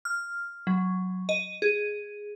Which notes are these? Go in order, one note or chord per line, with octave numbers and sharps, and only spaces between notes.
F6
F#3
D#5
G#4